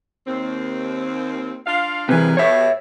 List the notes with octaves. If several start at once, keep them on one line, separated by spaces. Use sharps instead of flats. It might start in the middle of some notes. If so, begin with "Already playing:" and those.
D#2 C4
D4 F4 F5
C3 E3 G#4 A#4 B4
B2 G4 C#5 E5